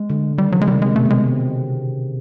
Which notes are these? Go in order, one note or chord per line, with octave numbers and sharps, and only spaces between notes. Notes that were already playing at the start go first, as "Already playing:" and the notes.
Already playing: G#3
D3
D#3 G3
C#3 F#3
G#3
C3 G3
G#3
B2 A3
C3
G#3